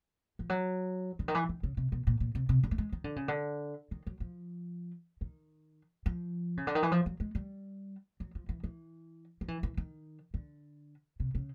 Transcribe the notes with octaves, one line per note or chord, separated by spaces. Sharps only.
F3
F#3
D3
D#3
E3
D#3
C#3
C3
B2
A#2
A#2
C3
C3
D3
A3
G#3
D#3
D3
C#3
D3
D#3
F#3
F3
D#3
F3
C#3
D3
D#3
E3
F3
F#3
G#3
G3
F#3
F3
E3
E3
F3
E3
E3
D#3
D3
C3
C#3